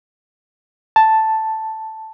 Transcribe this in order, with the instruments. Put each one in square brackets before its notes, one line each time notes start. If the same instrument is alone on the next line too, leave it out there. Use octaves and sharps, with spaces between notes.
[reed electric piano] A5